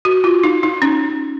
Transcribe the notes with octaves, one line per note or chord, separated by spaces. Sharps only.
F#4
F4
D#4
D#4
C#4